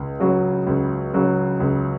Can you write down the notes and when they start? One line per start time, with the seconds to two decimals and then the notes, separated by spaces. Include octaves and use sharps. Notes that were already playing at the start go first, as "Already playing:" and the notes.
Already playing: C#2
0.20 C#3 F#3
0.67 C#2
1.14 C#3 F#3
1.60 C#2